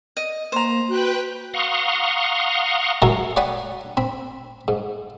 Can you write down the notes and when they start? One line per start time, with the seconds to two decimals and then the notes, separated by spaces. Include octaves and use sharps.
0.17 D#5
0.52 A#3 C5 A#5
0.88 F#4 B4 G5 F#6
1.54 F5 F#5 A#5 C6 C#6 D#6
3.02 F#3 G#3 E4 G#4 A#4 C#5
3.36 C#5 D5 F#5 G5 B5 D#6
3.97 C4 B5
4.68 G#2